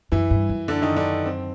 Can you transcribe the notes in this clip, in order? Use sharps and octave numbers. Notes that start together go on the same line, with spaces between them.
F#2 E3 E4
G2
F#2
D3 D4
D#3 D#4
D3 D4
C4